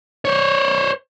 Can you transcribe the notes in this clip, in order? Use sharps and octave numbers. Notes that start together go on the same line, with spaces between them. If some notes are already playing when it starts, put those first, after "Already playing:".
C5 C#5